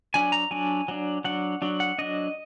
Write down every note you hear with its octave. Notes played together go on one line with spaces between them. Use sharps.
F#3 D4 G#5
A#5
F#3 D4 G#5
F#3 D4
F#3 D4 F#5
F#3 D4
F#5
F#3 D4 D#5